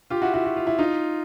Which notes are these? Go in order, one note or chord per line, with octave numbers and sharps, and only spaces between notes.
F4 G4
E4 F#4
E4 F#4
F#4
F4
E4
D#4 F4